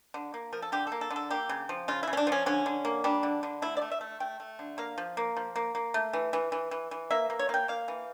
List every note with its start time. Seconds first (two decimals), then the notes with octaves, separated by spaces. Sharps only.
0.14 D3
0.34 A#3
0.53 F3 A#4
0.62 A4
0.72 D3 G4
0.87 A#3 A4
1.01 A4
1.11 D3
1.16 A4
1.31 A#3 G4
1.49 C#3
1.69 F3
1.88 C#3 F4
2.03 E4
2.08 C#3
2.13 C#4
2.17 D4
2.27 F3
2.32 C#4
2.46 D3 C#4
2.66 D3
2.85 A#3
3.04 G3 D4
3.23 D3
3.43 D3
3.62 A3 E4
3.77 D5
3.82 A3
3.91 E5
4.01 A3
4.20 A3 G5
4.40 A3
4.59 D3
4.78 A#3 F5
4.98 F3
5.17 A#3
5.37 F3
5.56 A#3
5.75 A#3
5.94 A3
6.13 E3
6.33 E3
6.52 E3
6.71 E3
6.91 E3
7.11 A#3 E5
7.30 A#3
7.39 C#5
7.49 A#3 F5 G5
7.68 A#3 F5
7.88 E3